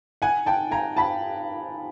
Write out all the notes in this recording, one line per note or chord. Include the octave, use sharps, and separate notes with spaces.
F#5 G#5
G5 A5
G#5 A#5
A5 B5